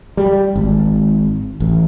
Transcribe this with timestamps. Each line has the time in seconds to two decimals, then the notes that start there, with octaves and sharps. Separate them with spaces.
0.17 G3
0.56 G#1
1.60 A1